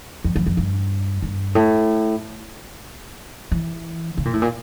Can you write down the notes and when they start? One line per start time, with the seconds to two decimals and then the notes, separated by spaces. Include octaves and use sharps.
0.24 F2
0.36 F2
0.46 F2
0.57 G2
1.22 G2
1.55 A2
3.52 E3
4.18 C#3
4.25 A#2
4.33 A2
4.42 A#2